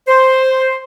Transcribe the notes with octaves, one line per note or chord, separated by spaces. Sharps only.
C5